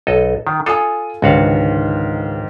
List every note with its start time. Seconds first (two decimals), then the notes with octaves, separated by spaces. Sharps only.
0.07 B1 A4 D#5
0.47 D#3
0.66 F4 A4 G#5 D#6
1.22 C#2 G#2 D3 D#3 F#4 F5